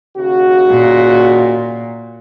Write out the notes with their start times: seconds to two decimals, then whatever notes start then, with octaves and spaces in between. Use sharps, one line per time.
0.17 D#2 C#3 F#4
0.71 A#2